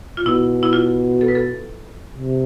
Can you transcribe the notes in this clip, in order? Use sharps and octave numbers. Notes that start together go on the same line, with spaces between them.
F4
B2 E4
E4
F4
A4
B4
A4
C3